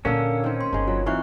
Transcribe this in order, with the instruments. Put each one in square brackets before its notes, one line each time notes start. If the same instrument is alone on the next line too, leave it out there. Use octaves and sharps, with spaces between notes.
[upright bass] A#2 [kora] D3 A#3 D4 [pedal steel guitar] C#4 [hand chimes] A#4 F5 E6
[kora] D#3 C4
[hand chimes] C6
[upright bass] G1 [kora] G#3 D#4
[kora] F#3 [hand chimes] F4
[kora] E3 D#4 F5 [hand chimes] C4 C#6 F#6